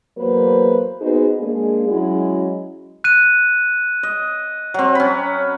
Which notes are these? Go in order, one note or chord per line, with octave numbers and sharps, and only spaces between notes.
E2 F#3 A#3 B4 C5
B3 D#4 F#4 G#4 B4 C5
G#3 A#3 D4 G#4
F#3 G#3 C#4 E4 F#4
F#6 D#7
D#5
F#3 C4
C#4 B5